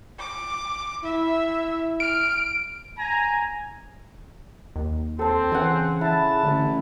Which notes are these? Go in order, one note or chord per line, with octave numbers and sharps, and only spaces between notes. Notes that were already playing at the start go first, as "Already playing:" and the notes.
D6
E4 E5
F6 D7
G#5 A#5
D#2
C4 A4 A5
C#3 E3 F#5 G#5
E4 A5
A1 D3